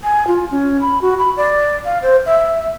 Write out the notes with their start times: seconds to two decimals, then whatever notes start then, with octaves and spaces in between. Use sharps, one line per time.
0.04 G#5
0.27 F4
0.51 C#4
0.81 B5
1.01 F#4
1.18 B5
1.37 D5
1.85 F5
2.02 C5
2.26 E5